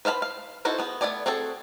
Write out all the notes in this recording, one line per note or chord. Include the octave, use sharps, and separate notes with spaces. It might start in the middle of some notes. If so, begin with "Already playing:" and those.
B4 C5 F5 G#5 B5
F5
D#4 E4 F#4 A4 C5
B3 G#4
A3 B3 F#4 D5 G#5
C4 F#4 G#4 A4